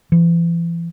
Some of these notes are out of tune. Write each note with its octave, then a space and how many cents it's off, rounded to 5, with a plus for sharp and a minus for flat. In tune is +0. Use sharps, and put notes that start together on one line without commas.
E3 +40